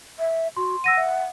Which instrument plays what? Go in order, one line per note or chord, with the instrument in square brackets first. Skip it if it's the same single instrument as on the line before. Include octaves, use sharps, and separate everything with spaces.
[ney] E5
[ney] F#4 [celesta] C6
[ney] F#5 [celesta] E6 A#6 D#7
[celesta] E5